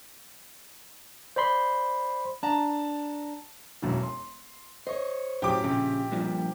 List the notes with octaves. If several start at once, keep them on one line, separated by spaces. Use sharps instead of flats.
C5 D5 B5 C6
D4 A5 A#5
E1 F#2 E3
C6
C5 C#5 D#5
F#2 A2 G4 D6
A#1 C#3
G2 A#2 F3